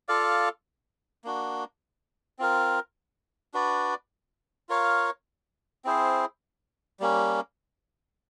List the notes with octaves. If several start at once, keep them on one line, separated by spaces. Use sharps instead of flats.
F4 A4 D5 F5
A#3 D4 F#4
C4 F4 A#4
D4 F#4 B4 D5
F4 A#4 C#5 F5
C4 E4 G#4 C5
G3 A#3 C#4